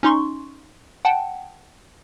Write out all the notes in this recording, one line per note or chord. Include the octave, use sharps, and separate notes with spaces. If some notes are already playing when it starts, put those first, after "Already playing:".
C#4 D#4 C6 C#6
F#5 G5 A5